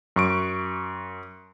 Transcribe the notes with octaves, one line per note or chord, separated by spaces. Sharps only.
F#2 C#6 D7